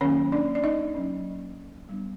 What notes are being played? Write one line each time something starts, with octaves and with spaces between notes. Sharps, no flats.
D#3 F#3 A#3 C#4 C#5
D4 D5
D5
D#4 D#5
F#3 A#3 C#4
G3 B3 D4